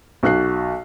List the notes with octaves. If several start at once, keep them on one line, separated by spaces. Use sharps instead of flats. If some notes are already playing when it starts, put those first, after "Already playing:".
B1 F#4 F#6 C7